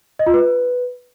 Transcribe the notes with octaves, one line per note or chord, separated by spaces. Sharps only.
D#5
F4
B4